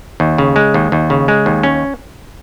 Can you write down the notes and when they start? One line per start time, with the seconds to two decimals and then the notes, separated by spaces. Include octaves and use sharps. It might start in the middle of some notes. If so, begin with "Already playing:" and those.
0.20 D#2
0.38 C#3
0.56 G#3
0.74 D#2
0.92 D#2
1.10 C#3
1.28 G#3
1.46 D#2
1.63 C#4